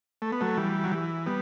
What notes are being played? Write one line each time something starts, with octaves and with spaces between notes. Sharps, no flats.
A3
B3
F#3 A3
E3 G3
F#3
E3
G3 B3